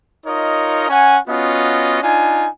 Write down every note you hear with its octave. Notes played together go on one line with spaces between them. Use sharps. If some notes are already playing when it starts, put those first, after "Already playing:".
D#4 F4 A#4 C#5 D#5
C#4 F#5 G#5
B3 C#4 F4 F#4 D#5
D4 D#4 F4 G#5